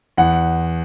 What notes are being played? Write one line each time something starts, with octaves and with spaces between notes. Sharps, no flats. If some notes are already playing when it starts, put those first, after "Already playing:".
E2 F#5